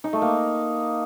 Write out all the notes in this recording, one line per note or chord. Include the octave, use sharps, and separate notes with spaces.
D#4
A3
A#3